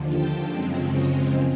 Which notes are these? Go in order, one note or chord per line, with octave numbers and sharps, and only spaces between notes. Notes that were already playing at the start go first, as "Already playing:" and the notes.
Already playing: D#2 D3 F3
G5 A5
F#2 C#3 F3 G#3 C4
C#5 D#5